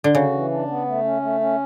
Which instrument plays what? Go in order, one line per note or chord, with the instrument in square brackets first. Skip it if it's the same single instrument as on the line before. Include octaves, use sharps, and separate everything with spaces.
[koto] D3
[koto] C#3 [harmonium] F#4
[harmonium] E3
D4
B3
A3
C#4
A3
C#4